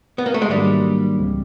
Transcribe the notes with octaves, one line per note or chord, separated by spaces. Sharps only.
B3
A#3
A3
G#3
G#2 D#3 F#3 G3 A#3 D4
C#2 C#3 E3 G#3 C4